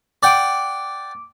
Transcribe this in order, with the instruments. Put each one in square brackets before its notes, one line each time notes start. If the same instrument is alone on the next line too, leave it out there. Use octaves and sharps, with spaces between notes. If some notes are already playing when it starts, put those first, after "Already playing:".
[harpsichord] D5 F#5 G5 [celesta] D6 D7